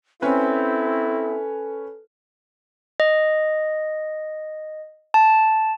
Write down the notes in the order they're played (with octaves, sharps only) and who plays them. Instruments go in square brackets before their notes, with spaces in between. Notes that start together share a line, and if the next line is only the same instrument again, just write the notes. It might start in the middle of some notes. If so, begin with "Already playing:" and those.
[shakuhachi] C4 [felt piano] C#4 B4 [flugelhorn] E4 [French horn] A4
[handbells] D#5
A5